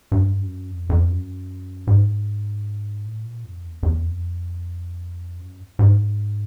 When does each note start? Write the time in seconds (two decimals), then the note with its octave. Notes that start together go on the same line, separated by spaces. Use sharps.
0.12 G2
0.41 F#2
0.70 F2
0.90 F2
1.10 F#2
1.87 G#2
3.05 A2
3.25 A#2
3.44 F2
3.64 E2
3.83 E2
4.02 F2
5.40 F#2
5.79 G#2